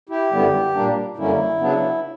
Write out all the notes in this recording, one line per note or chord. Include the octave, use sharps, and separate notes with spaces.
E4 G4
F#2 D3 G3 B3 E4
A#2 G3 A#3 D4
F#2 D3 G3 A#3 C#4 E4
C#3 F#3 B3 D4